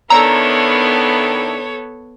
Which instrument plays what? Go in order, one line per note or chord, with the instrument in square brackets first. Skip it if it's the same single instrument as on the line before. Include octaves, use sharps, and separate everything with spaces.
[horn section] D#3 D4 E4 [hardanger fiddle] B3 [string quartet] A4 C#5 [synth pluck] A#5 E6